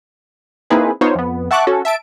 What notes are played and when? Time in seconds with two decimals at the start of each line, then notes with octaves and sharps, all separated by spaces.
0.70 A#3 C4 D#4 E4 G#4 B4
1.01 B3 D#4 F4 C5 C#5
1.15 F2 B3
1.51 E5 F#5 A5 C#6 D6 F#6
1.67 C#4 F#4 A4
1.85 E5 A5 D7